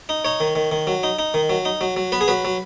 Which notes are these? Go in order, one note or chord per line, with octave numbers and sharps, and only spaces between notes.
D#4
D#4 C#5
D#3
D#3
D#3
F#3
D#4
D#4
D#3
F#3
D#4
F#3
F#3
B3 B4
G#4
F#3 B4
F#3